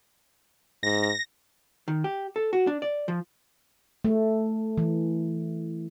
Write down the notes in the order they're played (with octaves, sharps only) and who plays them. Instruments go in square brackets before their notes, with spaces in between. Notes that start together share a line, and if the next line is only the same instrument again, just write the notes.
[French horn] G#2 [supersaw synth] A#6
[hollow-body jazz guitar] D#3
G4
A4
F#4
D4
D5
F3
[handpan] A3
E3